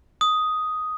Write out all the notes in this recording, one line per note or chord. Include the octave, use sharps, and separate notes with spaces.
D#6